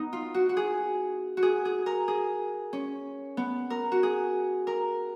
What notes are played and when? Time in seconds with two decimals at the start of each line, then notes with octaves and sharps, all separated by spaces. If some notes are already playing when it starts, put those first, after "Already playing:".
Already playing: B3 D#4
0.13 F4
0.34 F#4
0.49 F#4
0.57 G#4
1.37 F#4
1.43 G#4
1.65 G#4
1.86 A#4
2.08 G#4
2.73 C#4
3.37 B3
3.70 A#4
3.92 F#4
4.03 G#4
4.67 A#4